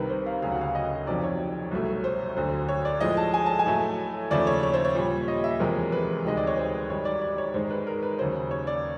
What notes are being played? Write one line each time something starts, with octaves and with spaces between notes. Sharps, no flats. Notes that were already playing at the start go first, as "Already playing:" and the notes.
Already playing: C2 C3 D#3 A#4 B4
C5
F5
D2 C#3 F#3 F5
F#5
F5
D#5
F2 C3 D#3 F#3 D5
C#5
C2 B2 F#3 A3
C5
D2 D3 F#3 C5
C#5
D5
A2 F3 G#3 D#5
A5
G#5
A5
G#5
A2 F#3 A3
D#2 C#3 F3 A3 D5
C#5
C#5
C5
C#5
A#2 G3
D#5
E5
E2 C3 F3 G#3 A#4
B4
D2 C3 D#3 G#3 D#5
D5
C#5
C5
G#2 D#3 G3 C#5
D5
D5
C#5
G#2 D#3 G#3 C5
B4
A#4
B4
D#2 C#3 F#3 C5
C#5
D5